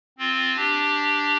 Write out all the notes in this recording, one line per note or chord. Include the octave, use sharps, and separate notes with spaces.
C4 F4
D4 G4